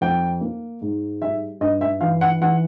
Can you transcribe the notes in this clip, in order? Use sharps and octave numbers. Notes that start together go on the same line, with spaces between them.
F2 G5
A#3
G#2
G3 E5
G2 D#5
E5
E3 F5
F#5
E3 F#5